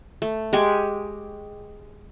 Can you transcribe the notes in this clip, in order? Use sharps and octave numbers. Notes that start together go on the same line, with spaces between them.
A3
G#3 G4 G#5 C#6